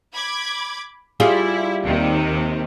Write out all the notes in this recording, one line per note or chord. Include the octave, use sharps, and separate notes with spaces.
B5 D6 G#6
G3 E4 F4 G#4
D#2 C3 D#3